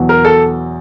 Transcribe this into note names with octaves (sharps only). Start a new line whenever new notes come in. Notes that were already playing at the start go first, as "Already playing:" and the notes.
Already playing: E2 B2 F#3
A#4
A4